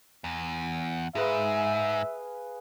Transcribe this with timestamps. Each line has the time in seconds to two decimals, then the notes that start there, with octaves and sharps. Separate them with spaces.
0.24 E2
1.15 G#2 G#4 B4 E5 F5